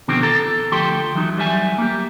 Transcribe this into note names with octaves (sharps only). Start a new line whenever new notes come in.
B2 D3 D#3 F3 C4 G4
A4 A#5
D2 F3 G4 A4 G5 C6
E3 F#3 D#4
F#3 G3 E5 G#5
A#3 G4